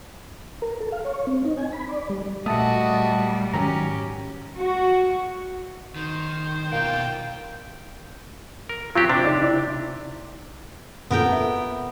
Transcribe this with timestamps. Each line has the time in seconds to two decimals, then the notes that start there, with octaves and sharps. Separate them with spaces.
0.62 A#4
0.80 A4
0.92 F5
1.05 C#5
1.27 C4
1.45 D#4
1.57 G#5
1.72 B5
1.89 D5
2.09 G3
2.46 A#2 G3 A3 F#4 D#5 E5 A5 D#6
3.53 G#2 D#3 F#3 C#4 G4 A#5
4.58 F#4
5.96 D#3 C5
6.72 B2 A#3 F4 G5
8.69 A#4
8.95 F#3 C4 F4 G4
9.09 C3 D4 C5
9.24 C#3 D#4 D5
9.42 E4 D5
11.11 A#1 F2 B3 A4 A#4 G5
11.32 E5